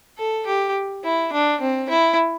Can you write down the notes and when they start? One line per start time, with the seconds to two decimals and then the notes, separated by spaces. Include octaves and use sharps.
0.18 A4
0.46 G4
1.04 E4
1.33 D4
1.60 C4
1.89 E4